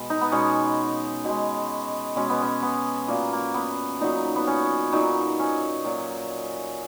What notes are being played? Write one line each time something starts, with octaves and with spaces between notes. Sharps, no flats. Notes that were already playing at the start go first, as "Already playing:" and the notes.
Already playing: B2 G#3
D#4
B3
B2 G#3 C#4
B2 G#3
B2 G#3 C#4
B3
C#4
B3
A#2 F#3 A#3
A#3
B3
A#2 F#3 D#4
B3
C#4
A#2 F#3 D#4
C#4
A#2 F#3